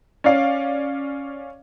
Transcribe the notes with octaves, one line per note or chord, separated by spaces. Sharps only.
C#4 D5 F5